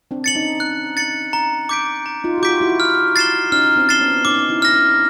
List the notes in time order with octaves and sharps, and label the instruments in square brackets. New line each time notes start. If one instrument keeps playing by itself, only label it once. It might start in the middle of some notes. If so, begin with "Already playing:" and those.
[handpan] C4 D4
[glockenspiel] A6 C#7 F#7
[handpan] C#4 D#4
[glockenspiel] F#6
A6 C#7 F#7
A#5
D6 G6 B6 D7
A#5
[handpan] D#4 F4
F#4
[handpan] F4 G4 [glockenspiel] D6 G6 B6 D7
[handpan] E4 F#4
[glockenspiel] F6
A6 C7 E7 G7
[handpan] C#4 D#4 [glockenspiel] F6
[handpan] C4 D4
[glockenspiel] A6 C7 E7 G7
[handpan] B3 C#4
[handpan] C#4 D#4 [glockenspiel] D6
[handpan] D#4
D4 E4
[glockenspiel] F6 A#6
[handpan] D4 E4